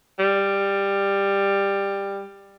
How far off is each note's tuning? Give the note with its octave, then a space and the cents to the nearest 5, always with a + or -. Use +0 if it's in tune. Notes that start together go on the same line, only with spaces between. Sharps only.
G3 +15